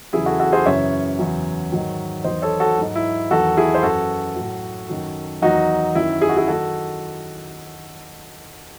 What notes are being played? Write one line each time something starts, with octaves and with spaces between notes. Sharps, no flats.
E2 C#3 F#3 E4 G#4
F#4 A4
F#4 A4
G#4 C5
F#2 C#3 E3 C#5 E5
E2 C#3 F#3
G#2 D#3 F#3
E2 D#3 F#3 C5 D#5
A4 C#5
F#4 A4
G#2 F#3
E4
E2 D#3 F#3 F#4 A4
E4 G#4
C5
F#2 E3 F#4 A4
A2 F#3
F#2 D#3 F#3
E2 D#3 F#3 D#4 F#4
F#2 D#3 F#3 E4
G#4
F#4
E4 G#4
D#3 F#3 F#4 A4